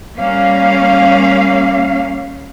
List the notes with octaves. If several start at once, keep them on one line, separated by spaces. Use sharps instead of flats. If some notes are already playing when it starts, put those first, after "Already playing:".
G3 A#3 C#4 F5